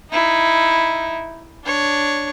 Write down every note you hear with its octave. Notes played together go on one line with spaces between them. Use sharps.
D#4 E4
D4 C#5